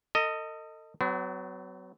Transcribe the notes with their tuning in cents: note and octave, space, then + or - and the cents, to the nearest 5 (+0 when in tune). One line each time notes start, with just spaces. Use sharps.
A4 +40 D#5 +0
F#3 +20 B3 +45